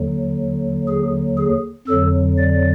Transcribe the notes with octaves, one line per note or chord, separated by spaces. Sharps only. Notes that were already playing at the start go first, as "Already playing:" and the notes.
Already playing: D#2 D3 F#3
G#4
G#4
F2 D3 F#3 A4
D5